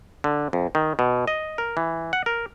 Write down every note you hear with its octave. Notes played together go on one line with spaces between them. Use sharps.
D3
F2
D#3
B2
D#5
A#4
E3
F#5
A#4